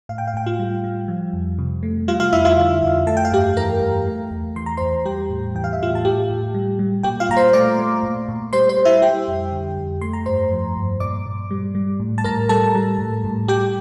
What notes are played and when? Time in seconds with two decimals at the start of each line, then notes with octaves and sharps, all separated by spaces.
0.09 A2 F5
0.18 G5
0.27 F5
0.34 A2 G5
0.46 F4 F5
0.59 G3
0.84 G3
1.08 F3
1.33 F2
1.59 C3
1.83 A3
2.08 G3 F4 F5
2.20 F4 F5
2.33 F2 E4 E5
2.45 F4 F5
2.57 D3
2.83 F2
3.07 A3 A5
3.17 G5
3.25 F5
3.32 G2 G4 G5
3.57 E3 A#4 A#5
3.81 G2
4.07 A3
4.31 E2
4.56 E3 C6
4.66 A#5
4.77 C5 C6
4.81 E2
5.05 G3 G4 G5
5.30 A2
5.55 E3 G5
5.64 F5
5.73 E5
5.81 A2 F4 F5
5.95 A5
6.05 A2 G4 G5
6.30 A2
6.54 G3
6.79 G3
7.03 A#2 G4 G5
7.20 F4 F5
7.29 A#2 A#5
7.37 C5 C6
7.53 A3 D5 D6
7.79 A3
8.03 A#2
8.28 A#2
8.53 G3 C5 C6
8.69 C5 C6
8.78 G3
8.85 E4 E5
9.02 G3 G4 G5
9.28 F2
9.52 D3
9.77 F2
10.01 A3 C6
10.13 A#5
10.26 G2 C5 C6
10.52 F3
10.76 G2
11.00 A#2 D5 D6
11.26 A#2
11.51 G3
11.75 G3
12.00 A2
12.18 A5
12.24 A2 A#4 A#5
12.49 G3 A4 A5
12.75 G3
12.99 A2
13.24 A2
13.48 G3 G4 G5